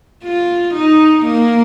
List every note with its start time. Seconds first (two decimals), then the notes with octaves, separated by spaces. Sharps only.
0.24 F4
0.74 D#4
1.25 A#3